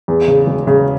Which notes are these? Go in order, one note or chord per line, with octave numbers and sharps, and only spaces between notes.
E2
C#3
E1
C#3